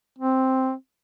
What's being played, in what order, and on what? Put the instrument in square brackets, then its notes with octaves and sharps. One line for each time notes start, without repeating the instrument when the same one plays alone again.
[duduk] C4